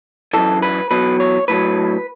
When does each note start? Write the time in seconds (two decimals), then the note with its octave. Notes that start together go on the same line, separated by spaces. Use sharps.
0.33 F#2 E3 A4
0.62 B4
0.91 E2 B2 F#3 B4
1.20 C#5
1.48 A2 F#3 B4